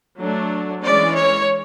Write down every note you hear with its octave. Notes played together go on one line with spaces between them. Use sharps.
F#3 A3 D4
E3 G#3 C#4 D5
C#5